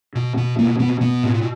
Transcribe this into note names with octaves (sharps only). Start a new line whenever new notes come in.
B2
B2
B2 A#3
B2 B3
B2 B3
A2